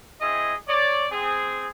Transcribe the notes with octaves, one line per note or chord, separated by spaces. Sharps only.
C4 E4 G#4 D#5
C#5 D5
C4 G#4